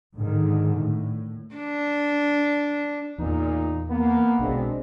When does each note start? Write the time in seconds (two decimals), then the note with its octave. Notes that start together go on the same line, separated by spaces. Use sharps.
0.17 G#2 D3 D#3
0.77 A2
1.55 D4
3.18 E2 A#2 D#4
3.90 A#3 B3
4.39 B1 B2 G#3 C4 D4